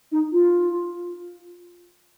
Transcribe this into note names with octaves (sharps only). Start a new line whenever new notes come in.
D#4
F4